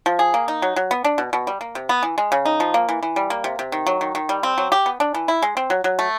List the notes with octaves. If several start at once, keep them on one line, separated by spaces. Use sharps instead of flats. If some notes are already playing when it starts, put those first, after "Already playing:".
F3
G#4
A#3
D#4
F#3
F#3
B3
D4
B2
B2
G3
A#3
C3
B3
E3
G#3
C#3
D#4
F3
A#3
E3
E3
G3
A#3
C3
C3
D#3
F#3
D#3
D#3
G3
C4
F#3
G4
B3
D4
E3
E4
G#3
C4
F#3
F#3
A3